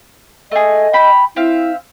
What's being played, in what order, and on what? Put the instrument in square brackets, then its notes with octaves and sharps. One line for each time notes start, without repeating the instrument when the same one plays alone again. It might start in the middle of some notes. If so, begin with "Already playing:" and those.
[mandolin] A3 G#4 [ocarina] D#5
[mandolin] G5 B5
[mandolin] C4 E5 F5 [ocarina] E4